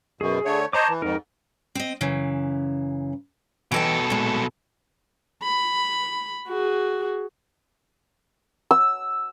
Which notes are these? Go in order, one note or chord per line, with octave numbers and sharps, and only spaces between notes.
F#2 B2 G#4
D3 A3 C#5
C5 C#5 D#5 A5 A#5 D6
E3
F2 G#2 D#4 A#4
C4 D#5
F#2 C#3 E3
B2 E3 A4 D#5 G5
A#2 G#3
B5
F#4 G#4
E6